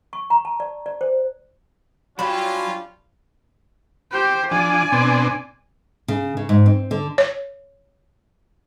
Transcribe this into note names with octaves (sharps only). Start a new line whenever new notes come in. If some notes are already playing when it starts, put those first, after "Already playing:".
C#6
A#5
A5
D5
D5
C5
F#3 G3 C#4 D4 F4 G4 B5
G4 C5
F3 D4 D5 G#5
B2 C4 D4
C#3
C#3
G#2
C4
D3
C#5